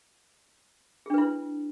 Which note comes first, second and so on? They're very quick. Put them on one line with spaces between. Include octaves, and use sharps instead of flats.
G#4 D4 B4 E4